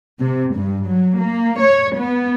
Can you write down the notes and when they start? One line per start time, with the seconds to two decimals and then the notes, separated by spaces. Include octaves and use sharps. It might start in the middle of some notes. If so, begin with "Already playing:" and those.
0.21 C3
0.55 G2
0.86 F#3
1.20 A#3
1.60 C#5
1.97 B3